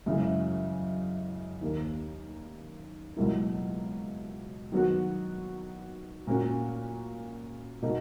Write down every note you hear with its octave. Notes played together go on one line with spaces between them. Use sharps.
F#2 C#3 E3 G#3
D#2 D#3 A#3
C#2 B2 F#3 A#3 E4
D#3 F#3 B3 F#4
A#2 A#3 C#4 F#4
B2 A#3 D#4 F#4